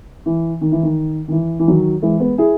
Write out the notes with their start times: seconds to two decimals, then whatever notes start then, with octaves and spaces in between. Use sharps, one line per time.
0.26 E3
0.61 D#3
0.72 E3
0.83 D#3
1.28 D#3
1.31 E3
1.59 E3
1.67 D#3 F#3
2.02 E3 G#3
2.20 G#3 B3
2.38 E4 G#4